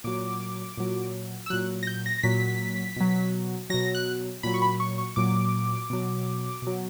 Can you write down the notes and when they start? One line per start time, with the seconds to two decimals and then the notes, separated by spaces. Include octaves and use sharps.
0.04 A#2 F#3 D6
0.77 A#2 F#3
1.46 E6
1.50 A#2 F#3 F#6
1.83 A#6
1.87 G6
2.06 A#6
2.18 A#6
2.23 A#2 F#3 B6
2.96 B2 F#3
3.70 B2 F#3 A#6
3.95 F#6
4.43 A#2 F#3 B5
4.54 C#6
4.62 B5
4.80 C#6
4.98 C#6
5.16 A#2 F#3 D6
5.90 B2 F#3
6.62 B2 F#3